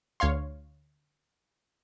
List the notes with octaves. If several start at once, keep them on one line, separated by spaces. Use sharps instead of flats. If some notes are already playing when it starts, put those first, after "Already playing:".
D2 C#5 F5 C6